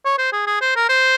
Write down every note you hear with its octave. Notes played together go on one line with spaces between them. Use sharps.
C#5
C5
G#4
G#4
C5
A#4
C5